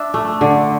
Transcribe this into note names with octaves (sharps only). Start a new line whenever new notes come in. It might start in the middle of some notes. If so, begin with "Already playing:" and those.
Already playing: D4 E5
A3
D3